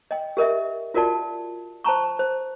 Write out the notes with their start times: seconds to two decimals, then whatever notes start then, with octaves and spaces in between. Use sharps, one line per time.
0.11 D#5 G5
0.37 G4 A#4 D#5 E5
0.94 F4 F#4 A#4 D5 A5
1.84 C5 A5 A#5 C#6
2.19 C5